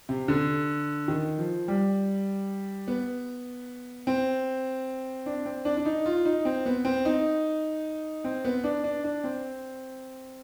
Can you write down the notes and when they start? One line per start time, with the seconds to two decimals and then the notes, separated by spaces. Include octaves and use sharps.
0.09 C3
0.28 D3
1.08 D#3
1.38 F3
1.68 G3
2.88 B3
4.07 C4
5.26 D4
5.45 C4
5.65 D4
5.77 D4
5.85 D#4
6.06 F4
6.25 D#4
6.45 C4
6.66 B3
6.85 C4
7.05 D#4
8.24 C4
8.45 B3
8.64 D4
8.84 D4
9.04 D4
9.24 C4